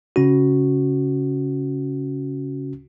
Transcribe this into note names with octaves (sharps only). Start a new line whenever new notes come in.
C#3 C#4 F#4